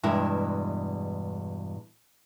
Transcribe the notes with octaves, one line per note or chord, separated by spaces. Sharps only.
E2 G2 B2 G#3 E4